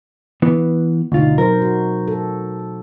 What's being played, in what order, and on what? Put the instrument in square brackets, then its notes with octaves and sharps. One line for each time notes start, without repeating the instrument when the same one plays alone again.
[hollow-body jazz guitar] E3 B3
[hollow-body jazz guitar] D2 F4 [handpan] B2 D#4
[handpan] F#3 C5 [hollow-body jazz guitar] A#4
[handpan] F#4
A4